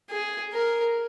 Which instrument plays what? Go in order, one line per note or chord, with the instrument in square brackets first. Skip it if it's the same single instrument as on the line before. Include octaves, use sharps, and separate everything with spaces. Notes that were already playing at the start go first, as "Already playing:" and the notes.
[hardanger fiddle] G#4
A#4